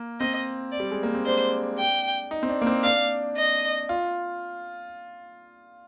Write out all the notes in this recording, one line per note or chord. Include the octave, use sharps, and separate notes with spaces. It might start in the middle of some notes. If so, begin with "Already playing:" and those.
Already playing: A#3
C4 D#5
D5
G3
G#3
A#3
C4
D4 C5
G5
D#4
C4
D4
A#3
C4
D4 F5
D#5
F4